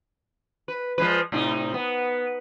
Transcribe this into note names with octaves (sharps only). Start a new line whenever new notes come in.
B4
F3 G#3 B4
A2 C3 D#4
B3